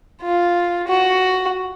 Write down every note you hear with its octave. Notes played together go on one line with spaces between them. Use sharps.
F4
F#4